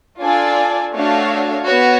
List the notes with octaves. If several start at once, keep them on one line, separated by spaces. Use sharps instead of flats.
D4 F4 A4 D5 G#5
A3 D4 F#4 C#5 F5
B3 F#4 C#5